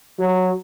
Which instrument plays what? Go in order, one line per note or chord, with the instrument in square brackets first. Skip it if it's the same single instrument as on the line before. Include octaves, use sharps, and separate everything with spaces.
[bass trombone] F#3